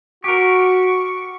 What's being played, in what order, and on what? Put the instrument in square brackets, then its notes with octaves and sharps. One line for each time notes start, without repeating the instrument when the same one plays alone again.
[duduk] F#4 [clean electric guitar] G4 A#4 [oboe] C#6